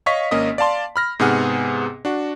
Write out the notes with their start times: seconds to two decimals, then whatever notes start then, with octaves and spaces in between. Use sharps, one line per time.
0.06 C#5 D#5 F5 C#6 B6
0.31 G#1 A#3 C#4 D#5 D#6
0.58 D5 F5 A5 C6
0.96 B5 F6 A#6
1.19 G#2 C3 B3 G#4 F#5 F6
2.05 D4 F#4